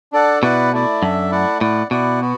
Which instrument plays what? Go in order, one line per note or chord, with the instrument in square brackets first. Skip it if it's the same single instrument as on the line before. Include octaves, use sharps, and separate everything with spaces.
[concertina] D4 A4 D5 F#5
[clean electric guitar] B2 [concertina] E4 B4 D5 F#5
[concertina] A3 E4 D5
[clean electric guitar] F#2 [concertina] D4 A4 E5
[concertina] A3 E4 D5 F#5
[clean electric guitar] A2 [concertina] E4 D5 F#5
[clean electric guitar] B2 [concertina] E4 D5 F#5
[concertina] B3 F#4